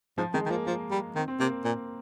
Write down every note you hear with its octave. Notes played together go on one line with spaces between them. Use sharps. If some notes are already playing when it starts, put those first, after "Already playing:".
G#2 F3
D#3 G#3
D#3
F3 A#3
F3 A#3
G3
D#3 C4
C4
C3 A#3
A#2 A#3